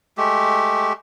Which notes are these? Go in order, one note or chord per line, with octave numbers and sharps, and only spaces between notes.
G#3 A3 G4